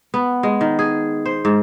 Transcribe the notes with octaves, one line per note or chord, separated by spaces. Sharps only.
B3
G#3
D#3
G#4
C5
G#2